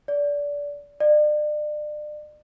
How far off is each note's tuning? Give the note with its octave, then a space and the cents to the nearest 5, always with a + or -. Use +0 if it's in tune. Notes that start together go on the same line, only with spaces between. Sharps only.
D5 -20
D5 +35